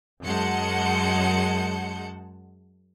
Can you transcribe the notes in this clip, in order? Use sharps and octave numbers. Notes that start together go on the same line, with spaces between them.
F#2 G#3 F#5 A5 G6 C#7